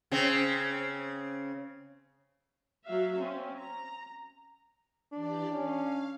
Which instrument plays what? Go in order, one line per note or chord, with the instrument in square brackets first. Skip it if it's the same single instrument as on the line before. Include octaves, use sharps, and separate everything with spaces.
[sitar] C#3 C4
[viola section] F#3 F#4 E5 F5
C4 C#4
A#5
[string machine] E3 G4 D5 [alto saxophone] D4
[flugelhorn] C#4 [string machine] F5